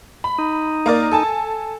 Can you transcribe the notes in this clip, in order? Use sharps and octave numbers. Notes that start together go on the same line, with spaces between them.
B5
D#4
A#3 A#4 D5
A4 G#5 A5